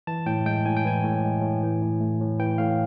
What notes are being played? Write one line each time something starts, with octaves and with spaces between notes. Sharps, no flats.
E3 A5
A2 G5
G#3 G5
A2 G#5
G5
E3 G#5
A2
G#3
A2
E3
A2
A3
A2
E3 G5
A2 F5